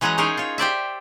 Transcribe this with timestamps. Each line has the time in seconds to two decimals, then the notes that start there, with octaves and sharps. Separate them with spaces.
0.01 E3 F#3 G#3 C#4 F#5 A#5
0.18 C#4 D#4 G#4 A#4 C5 C#5
0.37 F4 C#5
0.58 G4 C5 D5 E5